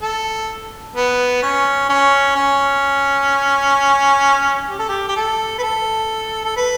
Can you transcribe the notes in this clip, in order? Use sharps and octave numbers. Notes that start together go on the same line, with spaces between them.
A4
B3
C#4
C#4
C#4
G4
A4
G4
G4
A4
B4
A4
A4
B4